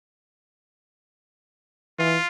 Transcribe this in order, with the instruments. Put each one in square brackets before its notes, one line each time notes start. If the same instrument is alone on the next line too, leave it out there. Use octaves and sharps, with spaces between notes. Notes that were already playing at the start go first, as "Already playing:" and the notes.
[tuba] E3 [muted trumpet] F4